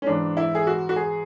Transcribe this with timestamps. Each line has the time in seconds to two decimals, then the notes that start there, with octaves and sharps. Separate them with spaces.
0.02 C#4
0.07 G#2 E3 D4
0.37 E4
0.55 G#4
0.67 F#4
0.89 F#4
0.96 G#4